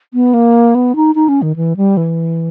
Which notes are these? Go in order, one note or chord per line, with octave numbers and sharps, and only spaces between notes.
B3
A#3
B3
D#4
D#4
C#4
D#3
E3
G3
E3